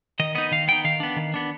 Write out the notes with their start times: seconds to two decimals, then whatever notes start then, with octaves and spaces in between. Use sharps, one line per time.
0.19 D#3 D#5
0.35 B3 D#4 D#5
0.51 D#3 F5
0.68 B3 D#4 G5
0.84 D#3 F5
1.00 B3 D4
1.16 D#3
1.34 B3 D4